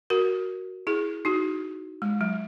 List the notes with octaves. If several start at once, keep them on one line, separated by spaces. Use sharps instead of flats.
F#4 A#4
E4 G#4
D#4 F#4
G#3
F#3